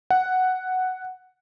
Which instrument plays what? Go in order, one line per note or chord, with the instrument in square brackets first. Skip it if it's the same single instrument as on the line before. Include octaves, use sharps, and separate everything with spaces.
[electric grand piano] F#5